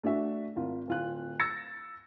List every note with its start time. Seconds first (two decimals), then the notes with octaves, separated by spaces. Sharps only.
0.03 A3 D4 F#4 E5
0.56 G#1 F4
0.88 D1 F4 F#6
1.40 E6 A6 A#6 C#7